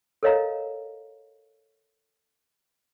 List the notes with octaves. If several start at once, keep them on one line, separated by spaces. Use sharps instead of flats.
A4 A#4 C#5 D#5 F5 A#5